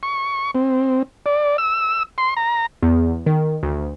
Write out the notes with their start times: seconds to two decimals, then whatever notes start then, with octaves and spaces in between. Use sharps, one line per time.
0.03 C#6
0.55 C4
1.26 D5
1.58 E6
2.18 C6
2.37 A#5
2.83 E2
3.26 D#3
3.63 D2